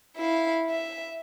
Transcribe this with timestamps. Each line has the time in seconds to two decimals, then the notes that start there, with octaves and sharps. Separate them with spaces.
0.17 E4 F5
0.70 E5